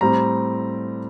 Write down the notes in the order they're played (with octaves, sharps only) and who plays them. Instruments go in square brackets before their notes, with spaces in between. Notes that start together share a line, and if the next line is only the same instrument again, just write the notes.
[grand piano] A2 G3 C4 A#5